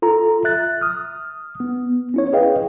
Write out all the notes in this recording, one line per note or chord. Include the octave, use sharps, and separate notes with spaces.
F4 A4 A#5
E5 F#6 A6
D#6 F6
B3
C#4 E4 C#5
G#4 B4 D#5 F5 G5